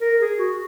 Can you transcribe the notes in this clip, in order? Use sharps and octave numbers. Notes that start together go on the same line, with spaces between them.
A#4
G#4
F#4